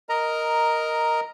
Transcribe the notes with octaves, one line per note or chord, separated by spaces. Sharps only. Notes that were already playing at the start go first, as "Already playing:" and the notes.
A#4 D#5 A#5